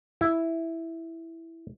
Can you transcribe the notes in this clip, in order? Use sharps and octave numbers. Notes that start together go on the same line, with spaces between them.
E4